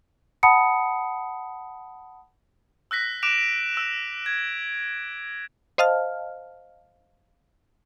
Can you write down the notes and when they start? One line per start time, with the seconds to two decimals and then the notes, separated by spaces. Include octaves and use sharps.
0.43 F#5 A5 B5 D#6 C#7
2.91 E6 F#6 A#6 B6
3.23 D6 F#6 D7 E7 F7
3.77 E6
4.26 G#6
5.78 C5 D#5 F5 A5 F6